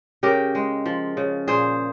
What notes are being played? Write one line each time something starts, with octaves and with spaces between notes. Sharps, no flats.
C#3 G4 A#4
G#3
F3
C#3
A#2 G#4 C5